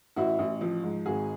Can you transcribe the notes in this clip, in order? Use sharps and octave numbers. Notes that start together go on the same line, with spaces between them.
A1 E4 F#4
A1
F3
G#2
G#1 F#4 G#4